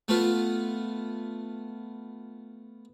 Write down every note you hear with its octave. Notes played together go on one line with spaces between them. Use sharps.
A3 B3 F4